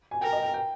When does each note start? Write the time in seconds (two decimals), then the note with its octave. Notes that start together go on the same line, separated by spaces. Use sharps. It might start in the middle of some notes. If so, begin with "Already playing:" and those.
0.11 G#5
0.21 A#4 G5
0.33 D#5
0.43 G5
0.54 G5